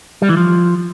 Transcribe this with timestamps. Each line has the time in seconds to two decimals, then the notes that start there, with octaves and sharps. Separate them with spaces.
0.22 G3
0.29 E3
0.37 F3